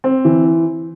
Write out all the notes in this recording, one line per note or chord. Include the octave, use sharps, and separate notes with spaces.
C4
E3